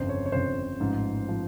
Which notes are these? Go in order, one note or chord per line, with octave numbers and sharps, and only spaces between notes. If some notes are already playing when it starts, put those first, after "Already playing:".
Already playing: G1 F2 C#3 C5
C#5
C#5
G1 F2 C#3 C5
A1 G#2 F3
F3